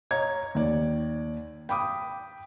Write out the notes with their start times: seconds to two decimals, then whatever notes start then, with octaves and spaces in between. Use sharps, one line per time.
0.11 C#5 D#5 A#5 G#6
0.55 D#2 D5
1.69 G5 B5 D6 D#6